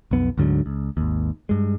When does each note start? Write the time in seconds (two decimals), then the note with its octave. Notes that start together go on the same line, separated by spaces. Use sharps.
0.11 B1 F2 B3
0.38 D2 G#2 D3 F#3
0.66 C#2
0.97 G#1 D#2
1.49 G2 G#3